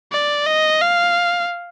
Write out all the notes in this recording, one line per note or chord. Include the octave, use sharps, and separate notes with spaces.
D5
D#5
F5